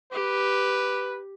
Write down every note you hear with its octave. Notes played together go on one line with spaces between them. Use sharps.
G4 B4